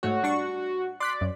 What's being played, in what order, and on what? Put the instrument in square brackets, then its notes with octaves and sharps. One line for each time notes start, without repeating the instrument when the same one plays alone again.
[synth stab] G#2 A3 C#5 [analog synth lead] F#4
[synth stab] G3 D4 C#6
[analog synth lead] D5 [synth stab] C6 F#6 B6
[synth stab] F#2